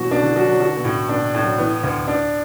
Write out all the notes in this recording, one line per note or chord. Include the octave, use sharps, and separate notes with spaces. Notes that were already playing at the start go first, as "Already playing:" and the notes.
Already playing: B2 E3 F#3 F#4
B2 D4
D3
F#3 F#4
F#3
D3 F#4
B2
A2
B2 D4
A2
F#3
E3 B3
D2
D4